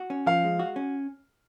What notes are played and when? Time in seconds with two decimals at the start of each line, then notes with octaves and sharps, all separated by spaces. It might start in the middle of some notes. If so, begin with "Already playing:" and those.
Already playing: F#4
0.10 C#4
0.26 F3 F5
0.44 G#3
0.59 F#4
0.76 C#4